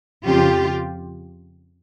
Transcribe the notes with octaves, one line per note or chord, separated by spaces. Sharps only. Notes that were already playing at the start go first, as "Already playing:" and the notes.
F2 C#3 F3 F4 G4